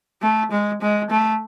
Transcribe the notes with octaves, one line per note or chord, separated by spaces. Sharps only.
A3
G#3
G#3
A3